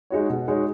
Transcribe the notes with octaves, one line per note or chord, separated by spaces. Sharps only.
G#3 D#4 F#4 C#5
B2
G#3 D#4 F#4 C#5